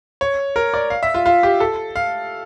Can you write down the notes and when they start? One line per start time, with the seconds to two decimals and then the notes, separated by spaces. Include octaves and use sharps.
0.21 C#5
0.56 A#4
0.74 D5
0.90 F5
1.03 E5
1.14 F4
1.26 F4
1.43 G4
1.60 A4
1.96 F5